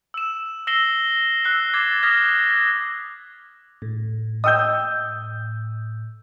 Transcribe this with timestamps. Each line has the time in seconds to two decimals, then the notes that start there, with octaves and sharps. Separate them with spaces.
0.14 E6 E7
0.67 E6 A#6 C7 E7 G7
1.45 E6 F#6 C7
1.74 D6 G#6 A6 C7
2.03 D#6 F6 G#6 A#6 B6
3.82 A2
4.44 D#5 G5 D#6 E6 G6